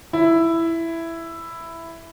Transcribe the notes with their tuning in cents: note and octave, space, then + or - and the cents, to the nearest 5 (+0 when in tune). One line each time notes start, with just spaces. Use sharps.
E4 +5